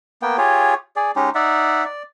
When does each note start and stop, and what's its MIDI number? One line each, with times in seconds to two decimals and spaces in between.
0.22 0.37 58
0.22 0.37 59
0.22 0.37 79
0.38 0.74 65
0.38 0.74 67
0.38 0.74 68
0.38 0.74 73
0.96 1.11 68
0.96 1.11 74
1.16 1.30 56
1.16 1.30 61
1.16 1.30 63
1.16 1.30 67
1.35 1.84 63
1.35 1.84 74
1.35 1.84 76
1.35 1.84 78
1.85 2.03 74